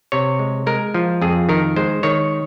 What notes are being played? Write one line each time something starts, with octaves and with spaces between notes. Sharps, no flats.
C3 C#5
G#3
G#3 A#4
F3
F2 G#4
D#3 A#4
G#3 C5
D#3 C#5